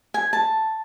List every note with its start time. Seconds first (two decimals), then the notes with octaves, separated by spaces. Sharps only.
0.14 G#5
0.33 A5